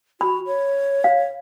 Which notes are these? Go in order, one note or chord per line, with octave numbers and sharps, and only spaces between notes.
F#4 B5
C#5
F5